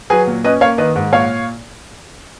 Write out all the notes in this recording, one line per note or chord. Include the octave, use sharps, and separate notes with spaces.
F#3 G#4 B4
A#2
C#4 B4 D#5
A#3 C#5 F5
D#3 B4 D#5
G#2
A#2 C#5 F5